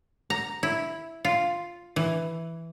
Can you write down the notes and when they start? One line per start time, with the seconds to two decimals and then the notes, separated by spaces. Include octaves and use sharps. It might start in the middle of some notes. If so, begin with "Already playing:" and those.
0.30 A#5
0.63 E4
1.25 F4
1.96 E3